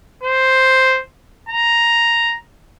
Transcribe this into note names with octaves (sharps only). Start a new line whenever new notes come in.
C5
A#5